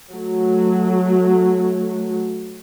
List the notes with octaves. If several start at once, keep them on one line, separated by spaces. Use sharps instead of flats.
F#3 A3